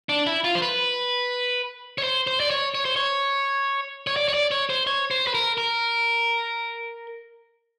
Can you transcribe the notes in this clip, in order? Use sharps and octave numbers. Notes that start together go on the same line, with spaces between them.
D4
E4
F4
C5
B4
C#5
C5
C5
D5
C#5
C#5
C5
C#5
C#5
D5
C#5
D5
C#5
C5
C#5
C5
B4
A#4
A#4